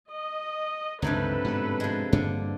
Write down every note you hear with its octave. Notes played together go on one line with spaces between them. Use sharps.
D#5
C#2 G2 C3 D#3 F#3 A4 B4
G#2 B2 D3
F3 G#3
G2 D3 A#3